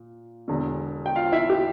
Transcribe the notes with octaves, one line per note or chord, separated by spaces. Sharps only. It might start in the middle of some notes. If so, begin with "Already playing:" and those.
Already playing: A#2
E1 E2 D3
G5
F4 F5
E4 E5
G4